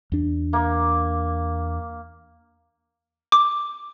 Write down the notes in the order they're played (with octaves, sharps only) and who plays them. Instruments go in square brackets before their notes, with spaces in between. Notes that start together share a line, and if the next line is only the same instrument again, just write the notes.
[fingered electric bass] E2 D4
[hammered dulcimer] A#3
[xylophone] D6